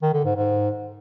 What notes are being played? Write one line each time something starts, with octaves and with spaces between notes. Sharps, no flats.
D#3
D3
G#2
G#2